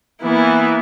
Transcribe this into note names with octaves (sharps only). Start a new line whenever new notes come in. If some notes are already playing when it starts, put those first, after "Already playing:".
E3 A#3 B3 E4